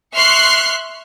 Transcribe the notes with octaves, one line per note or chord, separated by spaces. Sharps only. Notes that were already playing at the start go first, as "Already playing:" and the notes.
E5 C6 C#6 F6 F#6 C7